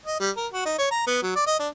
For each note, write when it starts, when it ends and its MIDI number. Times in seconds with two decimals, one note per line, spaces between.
0.06 0.19 75
0.20 0.30 55
0.36 0.47 70
0.53 0.65 66
0.65 0.75 63
0.78 0.87 73
0.91 1.06 82
1.07 1.19 59
1.23 1.34 54
1.35 1.44 74
1.46 1.58 75
1.59 1.68 62